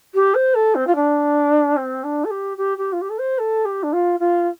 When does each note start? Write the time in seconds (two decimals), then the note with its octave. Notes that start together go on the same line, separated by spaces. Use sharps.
0.14 G4
0.35 C5
0.55 A4
0.75 C4
0.87 F4
0.95 D4
1.76 C4
2.04 D4
2.25 A4
2.30 G4
2.57 G4
2.78 G4
2.93 F4
3.01 G4
3.10 A4
3.18 C5
3.38 A4
3.65 G4
3.83 D4
3.93 F4
4.20 F4